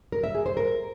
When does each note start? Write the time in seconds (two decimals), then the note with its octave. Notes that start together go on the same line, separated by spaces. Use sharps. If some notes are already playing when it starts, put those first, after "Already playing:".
0.12 A#4
0.24 E5
0.35 G#4
0.46 C5
0.57 A#4